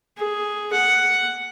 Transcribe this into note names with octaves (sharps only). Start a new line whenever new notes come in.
G#4
F#5